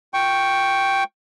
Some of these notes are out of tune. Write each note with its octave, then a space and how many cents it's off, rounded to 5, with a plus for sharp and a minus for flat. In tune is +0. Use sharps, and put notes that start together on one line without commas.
F4 +20 G5 +0 C#6 +0